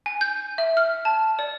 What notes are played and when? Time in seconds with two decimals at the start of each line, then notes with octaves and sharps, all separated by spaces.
0.06 G#5
0.21 G6
0.58 E5
0.77 F6
1.05 A5
1.39 D5